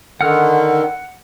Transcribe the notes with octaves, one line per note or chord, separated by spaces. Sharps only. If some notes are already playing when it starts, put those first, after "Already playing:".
D3 D#3 F#5 F6